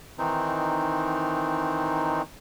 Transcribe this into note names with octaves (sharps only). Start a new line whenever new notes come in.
D#3 E3 C4 D#4